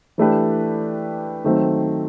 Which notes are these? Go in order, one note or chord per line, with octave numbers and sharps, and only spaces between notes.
E3 A3 D4 G4 B4
D#3 F#3 A3 C4